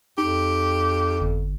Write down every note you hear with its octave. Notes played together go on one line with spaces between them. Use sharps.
F2 D#4 G4
G1